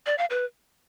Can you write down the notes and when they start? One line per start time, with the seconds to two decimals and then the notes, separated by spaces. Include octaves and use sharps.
0.06 D5
0.18 F5
0.30 B4